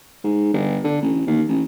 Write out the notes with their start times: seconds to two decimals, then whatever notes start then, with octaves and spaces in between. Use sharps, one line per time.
0.24 G#2
0.54 G1
0.84 D3
1.02 A1
1.26 D#2
1.49 A1